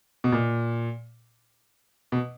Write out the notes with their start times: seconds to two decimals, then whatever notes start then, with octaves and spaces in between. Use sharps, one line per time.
0.24 B2
0.32 A#2
2.12 B2